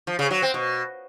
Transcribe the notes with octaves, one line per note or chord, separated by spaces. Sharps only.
F3
C#3
F#3
C4
B2